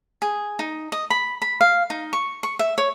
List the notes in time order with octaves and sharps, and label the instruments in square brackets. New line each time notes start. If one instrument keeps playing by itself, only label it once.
[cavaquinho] G#4
D#4
D#5
B5
B5
F5
D#4
C#6
C#6
E5
C#5